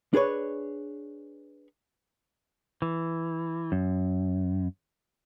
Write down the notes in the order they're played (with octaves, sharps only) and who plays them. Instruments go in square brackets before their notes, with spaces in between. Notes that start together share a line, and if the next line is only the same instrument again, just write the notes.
[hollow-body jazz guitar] D4 G#4 B4 C#5
[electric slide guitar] E3
F#2